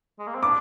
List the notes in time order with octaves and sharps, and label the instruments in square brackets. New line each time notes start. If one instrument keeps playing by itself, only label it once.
[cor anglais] G#3
A#3
C4
[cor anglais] D4 [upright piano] D6